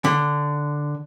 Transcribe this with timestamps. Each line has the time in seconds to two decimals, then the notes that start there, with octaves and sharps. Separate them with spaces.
0.05 D3